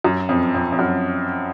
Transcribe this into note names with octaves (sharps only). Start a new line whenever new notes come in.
F#2
F2
F2
F2
F#2